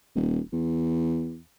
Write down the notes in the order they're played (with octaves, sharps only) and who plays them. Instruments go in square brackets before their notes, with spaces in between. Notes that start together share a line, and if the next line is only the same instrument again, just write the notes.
[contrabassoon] D#1
E2